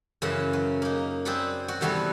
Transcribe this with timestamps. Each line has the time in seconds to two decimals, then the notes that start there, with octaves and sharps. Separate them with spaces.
0.22 F#2 C#3 E3 F#5
0.53 F#3
0.82 A#3 D#4
1.25 C4 G#4 D5 F#5 B5
1.68 F#4
1.81 C3 E3 G3 B3 F#4 A4